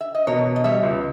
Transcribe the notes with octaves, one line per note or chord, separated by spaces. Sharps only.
E5
D#5
B2 A#4 C#5
B2
D#5
G3 C#5 E5
C#2